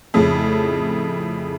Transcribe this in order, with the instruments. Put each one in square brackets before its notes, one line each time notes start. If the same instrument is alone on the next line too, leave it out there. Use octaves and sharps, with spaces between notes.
[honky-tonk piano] F2 A2 C#3